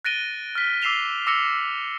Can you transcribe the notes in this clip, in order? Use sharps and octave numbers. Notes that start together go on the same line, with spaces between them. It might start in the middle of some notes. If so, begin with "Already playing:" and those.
F#6 A6 A#6 D7 D#7 G7
F6 B6
D6 E6 C7 E7 F7 G7
D6 E6 A#6 C#7 F7 G7